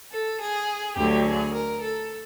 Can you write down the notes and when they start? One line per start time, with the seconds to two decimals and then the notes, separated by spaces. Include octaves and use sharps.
0.12 A4
0.40 G#4
0.96 D2 D3 F#3 G4
1.25 G#4
1.53 A#4
1.82 A4